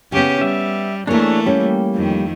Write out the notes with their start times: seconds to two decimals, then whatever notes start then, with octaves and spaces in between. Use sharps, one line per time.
0.12 C#3 B3 C#4 G4 G5
0.41 G3 E5
1.07 E3 A3 A#3 D4 G#4 A#4 C#5
1.46 G3 A#3 C#4 G5
1.95 F2 D#3